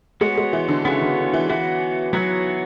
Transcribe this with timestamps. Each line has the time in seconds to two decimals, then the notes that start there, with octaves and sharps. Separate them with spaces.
0.21 G#3 B3 F#4 C#5
0.38 G#3
0.53 E3
0.68 D3
0.85 C#3 B3 F#4 C#5
1.01 D3
1.34 E3
1.49 E3 B3 F#4 C#5
2.13 F#3 B3 F#4 C#5